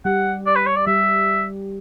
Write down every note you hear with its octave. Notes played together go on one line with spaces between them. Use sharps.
G3 G4 F#5
D5
B4
C#5
D5
G3 G4 E5